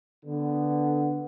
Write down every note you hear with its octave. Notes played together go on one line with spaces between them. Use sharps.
D3 B3